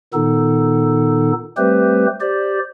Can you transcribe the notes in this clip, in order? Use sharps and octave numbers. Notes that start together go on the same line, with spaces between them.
A#2 D#3 B3 D#4 A4
G3 A3 C4 G4 B4 C5
G4 C5 D5